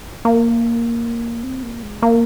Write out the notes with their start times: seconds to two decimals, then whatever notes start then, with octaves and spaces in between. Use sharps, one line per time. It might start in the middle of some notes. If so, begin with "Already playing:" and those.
0.25 A#3
1.44 C4
1.63 A#3
1.83 G#3
2.02 A#3